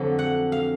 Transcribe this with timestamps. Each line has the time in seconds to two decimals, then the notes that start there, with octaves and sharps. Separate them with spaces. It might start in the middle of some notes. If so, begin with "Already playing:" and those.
Already playing: F2 D3 F#3
0.19 F#5
0.52 F5